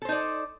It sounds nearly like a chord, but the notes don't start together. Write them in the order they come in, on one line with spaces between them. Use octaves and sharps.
A4 C5 D#4 D5